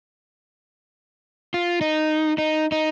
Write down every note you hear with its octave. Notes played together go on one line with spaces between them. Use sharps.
F4
D#4
D#4
D#4